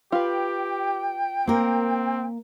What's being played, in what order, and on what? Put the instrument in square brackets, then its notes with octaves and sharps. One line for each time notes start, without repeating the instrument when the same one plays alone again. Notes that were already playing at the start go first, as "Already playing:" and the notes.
[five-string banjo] F4 B4 [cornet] G4 [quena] G5
[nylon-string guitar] A#3 A#4 [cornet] C4